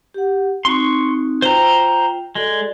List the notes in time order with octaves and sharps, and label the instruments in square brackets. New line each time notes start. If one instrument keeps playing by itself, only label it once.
[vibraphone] G4 F#5
[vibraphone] C4 D#4 F#4 [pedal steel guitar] C6 C#6
[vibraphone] F4 G5 [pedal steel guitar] C5 A#5
[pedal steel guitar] G#3 [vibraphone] F#4 A4 D5